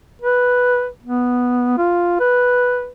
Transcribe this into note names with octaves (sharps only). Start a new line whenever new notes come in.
B4
B3
F4
B4